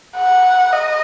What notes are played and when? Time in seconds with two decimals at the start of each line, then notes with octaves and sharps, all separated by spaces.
0.16 F#5
0.72 D#5